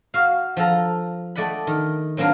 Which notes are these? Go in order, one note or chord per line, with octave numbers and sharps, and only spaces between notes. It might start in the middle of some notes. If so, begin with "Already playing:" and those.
F#4 F5
F3 A4 A#5
A3 D5 D#5 F#5 B5
D#3
F#3 A#3 C4 D4 A#4 B4